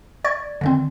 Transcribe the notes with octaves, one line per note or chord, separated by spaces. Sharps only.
D5 C#6 G#6 A6
D3 D#3 C4